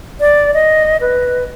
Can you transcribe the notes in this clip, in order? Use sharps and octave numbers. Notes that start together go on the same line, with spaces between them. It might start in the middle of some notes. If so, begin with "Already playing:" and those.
D5
D#5
B4